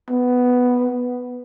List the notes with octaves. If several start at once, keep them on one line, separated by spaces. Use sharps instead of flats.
B3